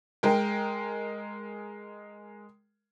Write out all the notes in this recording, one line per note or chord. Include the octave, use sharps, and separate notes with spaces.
G#3 A#4 G5